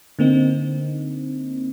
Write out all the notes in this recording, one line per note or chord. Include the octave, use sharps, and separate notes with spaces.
D3 A#3 C4 D#4